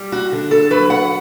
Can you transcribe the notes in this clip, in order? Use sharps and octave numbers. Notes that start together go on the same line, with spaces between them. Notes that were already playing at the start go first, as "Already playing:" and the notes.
Already playing: G3
F#4
D3
A4
F#3 B4
F#5